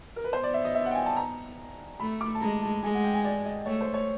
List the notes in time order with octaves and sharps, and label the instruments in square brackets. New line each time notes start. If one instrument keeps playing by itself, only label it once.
[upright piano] A#4
B4
[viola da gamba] B3 [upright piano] C5
[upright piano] D5
E5
D#5
E5
F#5
G5
G#5
A5
A#5
[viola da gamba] A3 [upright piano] B5
[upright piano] D6
A5
[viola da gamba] G#3 [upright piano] A#5
[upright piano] A5
[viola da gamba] G#3 [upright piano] G#5
[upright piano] F#5
G5
G#5
D5
D#5
[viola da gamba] A3 [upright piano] C#5
[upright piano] C5
C#5